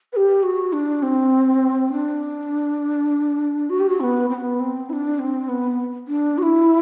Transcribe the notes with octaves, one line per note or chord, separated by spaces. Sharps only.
B4
G4
F#4
D4
C4
D4
F#4
G4
F#4
C4
B3
C4
B3
C4
E4
D4
C4
B3
D4
F#4
E4